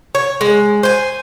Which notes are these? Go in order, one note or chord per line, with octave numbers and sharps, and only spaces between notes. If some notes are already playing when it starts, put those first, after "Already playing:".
C#5
G#3
C5 G#5